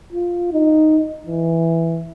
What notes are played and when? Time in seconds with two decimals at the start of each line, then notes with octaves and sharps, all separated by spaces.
0.13 F4
0.52 D#4
1.26 E3